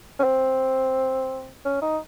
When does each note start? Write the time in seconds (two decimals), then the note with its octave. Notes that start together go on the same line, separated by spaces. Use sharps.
0.19 C#4
0.24 C4
1.65 C#4
1.82 D#4